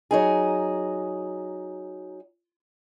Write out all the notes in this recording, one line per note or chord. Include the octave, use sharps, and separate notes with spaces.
F#3 D#4 G#4